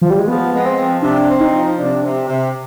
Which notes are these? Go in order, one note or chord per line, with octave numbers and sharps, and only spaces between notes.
F3
G3
G#3
F3 B3
G#3 B3
C4
F3
C3 D4
C4
D#4
F3
C3 D4
C3
C3